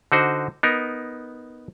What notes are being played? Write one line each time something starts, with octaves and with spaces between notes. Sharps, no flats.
D3 D#4 F#4 C5
B3 D#4 A#4